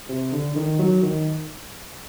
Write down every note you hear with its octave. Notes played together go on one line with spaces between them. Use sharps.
C3
D3
D#3
F#3
D#3